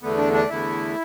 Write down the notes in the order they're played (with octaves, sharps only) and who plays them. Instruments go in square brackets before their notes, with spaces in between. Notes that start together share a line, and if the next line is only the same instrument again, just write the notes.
[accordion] E2 D3 A3 B3
D4
D4
E2 D3 A3 E4